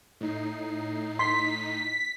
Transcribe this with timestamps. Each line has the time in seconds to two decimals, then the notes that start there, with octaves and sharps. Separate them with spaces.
0.21 A2 D#4 C7
1.19 C6 B6